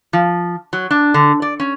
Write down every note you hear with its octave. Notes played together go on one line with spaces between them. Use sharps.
F3
F#3
D4
D3
D5
C#4